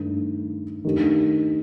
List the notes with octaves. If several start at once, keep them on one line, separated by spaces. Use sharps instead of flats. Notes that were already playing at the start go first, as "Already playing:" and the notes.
Already playing: G2 D#3 A3
D#3 A3 D4 G4